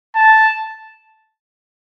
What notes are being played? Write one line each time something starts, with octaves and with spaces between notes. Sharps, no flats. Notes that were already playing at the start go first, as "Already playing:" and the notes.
A5